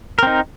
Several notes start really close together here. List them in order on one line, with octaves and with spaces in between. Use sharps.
A#4 C4 D#4